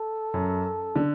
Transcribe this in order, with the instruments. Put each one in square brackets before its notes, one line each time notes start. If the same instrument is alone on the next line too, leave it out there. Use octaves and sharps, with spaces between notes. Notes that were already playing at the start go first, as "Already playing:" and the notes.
Already playing: [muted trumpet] A4
[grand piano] F#2
D3